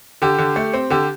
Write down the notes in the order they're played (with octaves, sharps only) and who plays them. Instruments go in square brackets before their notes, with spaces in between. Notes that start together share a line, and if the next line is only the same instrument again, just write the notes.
[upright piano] D3 G4
D3
A3
C4
D3 G4